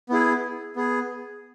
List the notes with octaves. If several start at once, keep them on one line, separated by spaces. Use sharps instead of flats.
B3 E4 G#4
B3 G#4